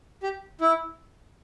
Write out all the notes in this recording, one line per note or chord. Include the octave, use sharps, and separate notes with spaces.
G4
E4